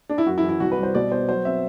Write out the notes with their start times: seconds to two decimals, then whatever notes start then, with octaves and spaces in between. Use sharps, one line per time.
0.09 D4
0.18 E4
0.26 F#2 F#4
0.38 E4
0.43 E3
0.49 E4
0.60 C2 F#4
0.72 B4
0.78 G3
0.83 C5
0.95 B2 D5
1.11 B3 C5
1.29 F#3 C5
1.45 C4 E5